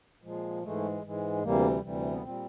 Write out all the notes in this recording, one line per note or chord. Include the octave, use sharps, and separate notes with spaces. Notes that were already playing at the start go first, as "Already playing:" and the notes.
A#2 F3 G#3
G#2 E3 G#3 A3
G#2 E3 G#3
D2 C3 E3 G3 A#3
D2 C3 E3 G3
B3
A#2 G3 C4